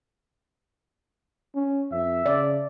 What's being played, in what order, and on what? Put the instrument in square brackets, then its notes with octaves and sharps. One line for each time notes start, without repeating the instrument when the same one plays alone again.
[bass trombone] C#4
[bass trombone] F2 [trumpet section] E5
[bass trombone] C#3 [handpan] D5